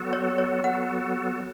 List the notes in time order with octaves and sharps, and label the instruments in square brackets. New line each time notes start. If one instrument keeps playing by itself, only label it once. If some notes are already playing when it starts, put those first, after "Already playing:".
Already playing: [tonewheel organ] F#3 B3 F#4 A4
[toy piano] C#5
C#5
[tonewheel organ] F#3 B3 F#4 A4 [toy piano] F#5